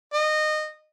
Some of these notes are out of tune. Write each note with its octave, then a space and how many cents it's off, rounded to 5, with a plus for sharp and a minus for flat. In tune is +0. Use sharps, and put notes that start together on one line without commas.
D#5 -20